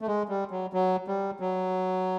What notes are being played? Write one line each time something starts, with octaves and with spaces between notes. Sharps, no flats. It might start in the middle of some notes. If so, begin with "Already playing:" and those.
A3
G#3
G3
F#3
F#3
G3
F#3